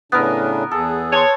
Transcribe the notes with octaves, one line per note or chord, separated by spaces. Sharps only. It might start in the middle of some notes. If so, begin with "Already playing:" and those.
A2 C#3 B3 D4 A#4
E2 G#4 A4
C#5 A5 C6